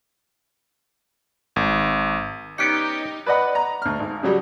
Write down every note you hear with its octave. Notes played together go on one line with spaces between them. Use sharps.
G#1
B3 C#4 D#4 G4 D5 C#7 D7
B4 D5 D#5 F#5 B5
A#5
D2 F6
G#1
C#3 F#3 G3